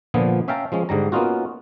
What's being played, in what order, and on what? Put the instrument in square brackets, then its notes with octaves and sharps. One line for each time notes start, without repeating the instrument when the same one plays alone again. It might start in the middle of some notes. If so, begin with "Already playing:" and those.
[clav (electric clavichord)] A#2 D3 F3 B3
C#4 E5 F5 G5 A5 A#5
F3 G#3 C#4
G#2 D3 G3 A#5
A#3 B3 C#4 D#4 F4 F#4